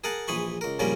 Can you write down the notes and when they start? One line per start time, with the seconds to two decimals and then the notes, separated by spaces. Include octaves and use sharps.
0.04 G#4 A#4 F#5 A5
0.28 A#1 E3 G#4 B5 C#6
0.61 C#2 A#4
0.79 A#1 A#2 C#3 G3 C#4 A#4